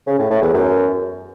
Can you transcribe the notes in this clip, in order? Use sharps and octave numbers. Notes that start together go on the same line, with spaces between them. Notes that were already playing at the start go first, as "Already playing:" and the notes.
C#3
A2
A2
E2
F#2